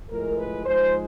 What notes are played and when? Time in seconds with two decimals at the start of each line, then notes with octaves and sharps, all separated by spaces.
0.10 A2 F3 G#3 A#4
0.38 B4
0.66 G#2 F3 G#3 C5